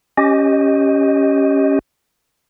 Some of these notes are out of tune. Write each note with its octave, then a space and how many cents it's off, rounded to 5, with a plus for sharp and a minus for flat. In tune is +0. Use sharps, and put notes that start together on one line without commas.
C#4 +0 G4 +0 D#5 +0